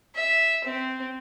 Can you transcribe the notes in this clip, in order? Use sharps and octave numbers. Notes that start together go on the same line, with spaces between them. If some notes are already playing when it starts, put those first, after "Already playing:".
E5
C4